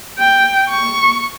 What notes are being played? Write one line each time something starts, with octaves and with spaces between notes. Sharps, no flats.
G5
C#6